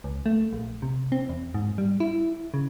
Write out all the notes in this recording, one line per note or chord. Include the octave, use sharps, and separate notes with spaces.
C#2
A3
A#1
C3
C4
E2
G#2
G3
E4
C#3